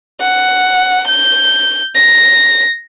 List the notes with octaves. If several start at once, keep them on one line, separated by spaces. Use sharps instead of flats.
F#5
G6
A#6